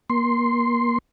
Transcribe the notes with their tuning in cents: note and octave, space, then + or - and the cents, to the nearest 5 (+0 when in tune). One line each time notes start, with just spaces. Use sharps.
A#3 +30 C6 +0